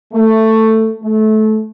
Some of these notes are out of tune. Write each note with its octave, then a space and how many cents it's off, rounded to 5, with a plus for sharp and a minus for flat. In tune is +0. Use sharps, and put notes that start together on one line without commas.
A3 +10
A3 -20